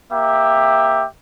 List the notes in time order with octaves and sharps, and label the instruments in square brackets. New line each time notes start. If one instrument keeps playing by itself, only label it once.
[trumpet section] A#3 G4 E5